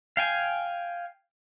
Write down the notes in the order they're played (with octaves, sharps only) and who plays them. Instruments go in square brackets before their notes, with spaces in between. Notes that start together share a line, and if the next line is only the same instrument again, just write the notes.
[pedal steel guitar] F5 G5 G#5